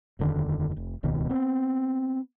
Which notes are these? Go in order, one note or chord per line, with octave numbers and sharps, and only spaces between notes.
D#1 F2 D3 D#3
F1
D#1 C#2 B2 D#3
B3 C4